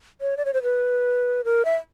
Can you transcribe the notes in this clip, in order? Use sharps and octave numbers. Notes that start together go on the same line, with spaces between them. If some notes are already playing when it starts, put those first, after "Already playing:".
C#5
D5
C#5
C5
B4
A#4
E5